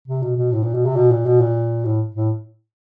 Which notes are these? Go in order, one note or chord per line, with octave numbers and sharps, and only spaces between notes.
C3
B2
B2
A2
A#2
B2
C3
B2
A#2
B2
A#2
A2
A2